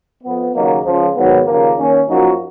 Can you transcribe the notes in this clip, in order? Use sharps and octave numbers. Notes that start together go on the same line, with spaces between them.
F2 F3 B3
D#2 C#3 F#3 A#3 D#4
C#2 C#3 F3
G#2 D#3 F#3 B3
D#2 C#3 F3 A#3
D#3 A#3 C#4
F#2 F3 A#3 D#4 F#4